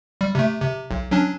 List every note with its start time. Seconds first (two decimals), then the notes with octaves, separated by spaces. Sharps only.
0.21 G3
0.35 C3 A3
0.62 C3
0.91 B1
1.11 F#3 C#4 D4